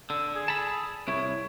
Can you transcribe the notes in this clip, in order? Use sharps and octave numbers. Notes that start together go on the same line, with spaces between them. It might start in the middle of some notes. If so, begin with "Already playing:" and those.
D3 E6
G#4
A5 B5
C2 E4 C#5